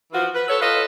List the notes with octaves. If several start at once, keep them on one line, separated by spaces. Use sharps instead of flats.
E3 F3 F4 F#4
B4
A4 C#5
F4 A4 B4 D#5